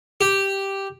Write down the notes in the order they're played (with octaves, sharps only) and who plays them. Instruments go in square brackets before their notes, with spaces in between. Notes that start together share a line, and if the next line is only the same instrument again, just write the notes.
[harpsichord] G4